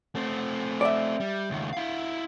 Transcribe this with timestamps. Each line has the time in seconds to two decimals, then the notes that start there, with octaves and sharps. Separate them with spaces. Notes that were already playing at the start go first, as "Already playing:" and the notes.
0.15 A3 C4
0.81 D5 E5
1.20 G3
1.50 C#2 D#3
1.73 E4 F5